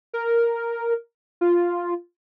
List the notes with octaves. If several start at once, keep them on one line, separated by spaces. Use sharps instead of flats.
A#4
F4